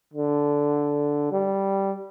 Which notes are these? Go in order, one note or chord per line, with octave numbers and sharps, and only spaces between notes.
D3
G3